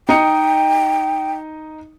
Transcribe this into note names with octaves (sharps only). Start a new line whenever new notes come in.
D#4 D#5 G5 C#7